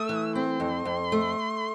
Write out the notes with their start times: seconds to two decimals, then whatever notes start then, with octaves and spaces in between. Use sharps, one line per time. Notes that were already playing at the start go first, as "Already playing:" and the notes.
Already playing: A3 E6
0.09 E3
0.35 C4 C6
0.60 F2
0.85 F2
1.12 A3